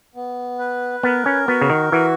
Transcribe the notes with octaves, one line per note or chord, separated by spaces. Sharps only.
B3
B4
B3 A#4
C#4
B3 F#4
C#3
D#3
E3 F#4